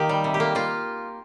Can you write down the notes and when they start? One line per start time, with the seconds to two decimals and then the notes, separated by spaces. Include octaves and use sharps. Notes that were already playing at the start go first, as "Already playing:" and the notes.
Already playing: D#3 A#3 G4
0.09 G3
0.24 C3
0.34 G4
0.40 A#3
0.55 A#3 F4